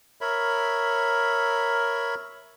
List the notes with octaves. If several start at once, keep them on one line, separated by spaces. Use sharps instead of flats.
A#4 C#5 E5 B5